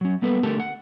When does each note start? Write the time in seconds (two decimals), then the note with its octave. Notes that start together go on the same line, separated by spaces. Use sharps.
0.01 F#3 C#4
0.22 G3 A#3 B3 A4 B4
0.43 D3 A3 G4 A4 A#4 A5
0.60 F#5